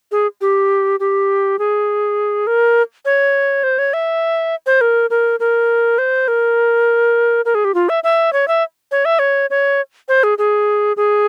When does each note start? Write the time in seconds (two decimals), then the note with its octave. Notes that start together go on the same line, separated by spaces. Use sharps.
0.12 G#4
0.41 G4
1.00 G4
1.59 G#4
2.47 A#4
3.05 C#5
3.63 C5
3.78 C#5
3.93 E5
4.66 C5
4.81 A#4
5.10 A#4
5.40 A#4
5.98 C5
6.28 A#4
7.45 A#4
7.55 G#4
7.65 G4
7.74 F4
7.89 E5
8.04 E5
8.33 C#5
8.48 E5
8.91 C#5
9.05 E5
9.19 C#5
9.50 C#5
10.08 C5
10.23 G#4
10.38 G#4
10.97 G#4